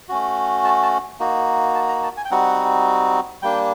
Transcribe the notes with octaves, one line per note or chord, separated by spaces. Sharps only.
A3 C#4 F#4
A5
A5
A#3 D#4 F#4
A5
A#5
A5
G#5
G5
G3 C4 D#4 F#4 F#5
G3 A#3 D4 G5